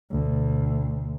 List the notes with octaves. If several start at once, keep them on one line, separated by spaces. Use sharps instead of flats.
D2 B2